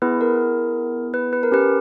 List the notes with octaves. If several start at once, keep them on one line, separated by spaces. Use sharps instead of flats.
B3 E4 G#4 B4
A#4
B4
B4
A#4
C#4 G4 B4